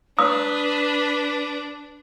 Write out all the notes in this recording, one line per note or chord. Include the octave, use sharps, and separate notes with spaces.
D4 B4 D#6